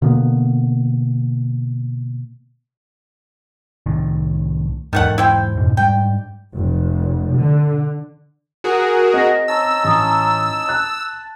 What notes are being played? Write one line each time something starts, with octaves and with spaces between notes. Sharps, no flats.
B2 D3 A#3 B3
C2 A2 D#3
E2 G#2 D#3 A3 F#5
E4 C5 G5
F2 G#2 B2
G#2 G3 G5
F1
D3
F#4 G#4 A#4
C4 D#5 A#6
C#4 D#4 A5 E6
A1 A#5 D#6
A5 F#6